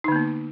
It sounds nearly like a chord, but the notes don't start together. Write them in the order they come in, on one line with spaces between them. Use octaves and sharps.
D#4 D3 A#3 B3